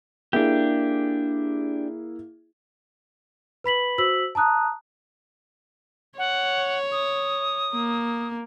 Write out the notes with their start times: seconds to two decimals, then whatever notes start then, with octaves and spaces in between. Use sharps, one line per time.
0.33 A#3 D4 E4 G4 G#4
3.64 B4 B5 B6 F#7
3.98 F#4 C5 E6 B6 F#7
4.35 A5 A#5 D#6 F#6
6.18 C#5 F#5
6.92 D#6
7.75 A#3